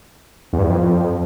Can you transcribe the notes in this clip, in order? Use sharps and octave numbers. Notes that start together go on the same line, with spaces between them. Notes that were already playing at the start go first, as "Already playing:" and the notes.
E2
G2
E2
F2